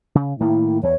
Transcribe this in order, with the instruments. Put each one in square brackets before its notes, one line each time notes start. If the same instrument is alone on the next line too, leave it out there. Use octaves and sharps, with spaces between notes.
[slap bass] C#3
[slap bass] A2 D#3 A#3 [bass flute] E4
[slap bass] E2 [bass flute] C#5